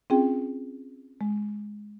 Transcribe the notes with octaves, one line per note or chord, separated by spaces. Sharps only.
C4 C#4 F4 G#4 G5
G#3